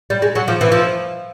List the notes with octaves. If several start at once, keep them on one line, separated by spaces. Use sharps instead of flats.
G3
G#3
F#3
F3
E3
F3